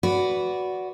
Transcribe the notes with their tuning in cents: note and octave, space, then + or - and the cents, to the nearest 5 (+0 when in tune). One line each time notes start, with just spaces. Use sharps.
F#4 +0 B4 +0 D5 -20